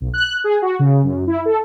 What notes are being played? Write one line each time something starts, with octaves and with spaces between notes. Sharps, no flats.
B1
F#6
G#4
F#4
C#3
F#2
E4
A4